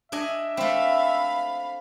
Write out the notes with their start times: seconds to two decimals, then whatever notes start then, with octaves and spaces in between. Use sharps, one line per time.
0.12 D4 D#5 E5 G#5
0.57 A3 C4 F5 B5